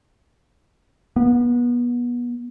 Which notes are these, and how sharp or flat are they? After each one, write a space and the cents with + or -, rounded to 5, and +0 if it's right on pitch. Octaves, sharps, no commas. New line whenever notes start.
B3 -30